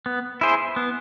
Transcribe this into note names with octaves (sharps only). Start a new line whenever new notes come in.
B3
E4 G#4 C5
B3